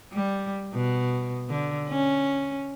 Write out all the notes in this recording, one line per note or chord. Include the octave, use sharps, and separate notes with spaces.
G3
B2
D3
C#4